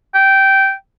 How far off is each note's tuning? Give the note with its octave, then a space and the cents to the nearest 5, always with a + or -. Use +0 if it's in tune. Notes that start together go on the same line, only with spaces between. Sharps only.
G5 -15